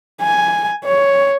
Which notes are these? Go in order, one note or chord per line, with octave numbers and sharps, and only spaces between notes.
G#5
C#5